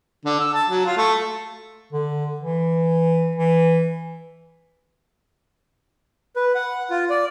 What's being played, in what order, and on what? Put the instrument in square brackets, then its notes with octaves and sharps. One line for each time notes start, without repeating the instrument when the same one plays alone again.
[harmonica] D3
E6
A5
F#3
F4
A3
[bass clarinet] D3
E3
E3
[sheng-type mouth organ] B4
F#5
F4
D5